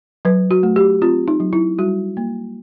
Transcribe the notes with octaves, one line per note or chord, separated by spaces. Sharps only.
F#3 B4
F#4
A3
G4
C4 F4
D#4
F#3
E4
G3 F#4
A#3